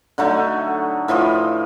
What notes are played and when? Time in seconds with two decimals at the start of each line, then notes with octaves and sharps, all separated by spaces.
0.18 D3 F#3 A3 D#4
1.08 A2 E3 F3 D#5